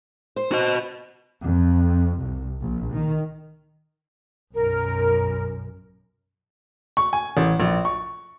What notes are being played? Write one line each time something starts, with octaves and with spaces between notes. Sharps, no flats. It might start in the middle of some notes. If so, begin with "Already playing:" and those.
C5
F#4 D#5
F2
C2
A#1
D#3
B1 F#2 A#4
C#6
G#5
A1
A#1
C#6